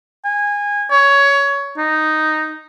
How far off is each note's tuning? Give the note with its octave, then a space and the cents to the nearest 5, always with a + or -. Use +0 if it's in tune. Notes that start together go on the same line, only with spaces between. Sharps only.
G#5 -20
C#5 +15
D#4 -5